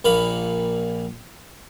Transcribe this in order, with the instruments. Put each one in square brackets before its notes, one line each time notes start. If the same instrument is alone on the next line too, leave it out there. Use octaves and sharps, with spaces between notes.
[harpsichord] A#1 A#2 F5 B5